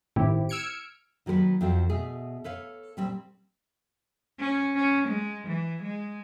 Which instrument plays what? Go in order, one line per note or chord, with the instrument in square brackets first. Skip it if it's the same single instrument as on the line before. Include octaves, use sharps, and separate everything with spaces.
[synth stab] G1 A2 D#3 C4 E4 G4
E6 F6 G#6 C#7 D7
[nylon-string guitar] D#3 F#3 A#3 A#4 B4
F2 F3 C4 F#4 A4 F5
B2 A3 G#4
A4 B4 C#5 F5
A#2 G3 C4
[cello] C#4
C#4
G#3
E3
G#3